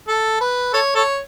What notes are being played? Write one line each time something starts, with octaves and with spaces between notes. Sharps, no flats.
A4
B4
A4 C#5
A4 C#5